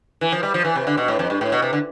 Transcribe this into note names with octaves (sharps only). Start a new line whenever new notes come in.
E3
F3
G3
F3
E3
C3
D3
B2
A2
F2
G2
A2
B2
C3
D3